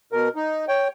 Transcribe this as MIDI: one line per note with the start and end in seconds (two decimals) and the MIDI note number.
0.12 0.29 47
0.12 0.29 70
0.36 0.65 63
0.68 0.88 73
0.68 0.88 79